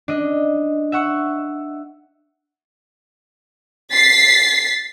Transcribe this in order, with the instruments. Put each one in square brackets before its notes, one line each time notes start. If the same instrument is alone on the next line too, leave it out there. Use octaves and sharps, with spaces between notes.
[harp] D4 D#5
E5 F#5 C#6
[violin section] A6 B6 C7